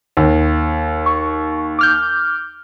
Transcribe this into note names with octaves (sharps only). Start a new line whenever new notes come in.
D#2
C#6
D6 F6 G6